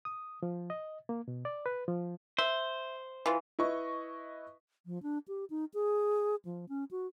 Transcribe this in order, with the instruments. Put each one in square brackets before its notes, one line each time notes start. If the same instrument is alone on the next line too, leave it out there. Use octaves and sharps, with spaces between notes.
[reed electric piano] D#6
F3
D#5
A#3
B2
D5
B4
F3
[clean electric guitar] C5 [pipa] E5
[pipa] E3 F4
[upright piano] E4 B4 D#5 C#6
[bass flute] F3
D4
G4
D#4
G#4
F3
C#4
F#4